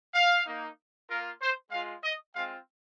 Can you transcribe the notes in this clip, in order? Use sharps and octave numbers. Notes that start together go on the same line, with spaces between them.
F5
A#3 D#4
A#3 F4 A#4
C5
G#3 F4 F5
D#5
G#3 C4 F4 F5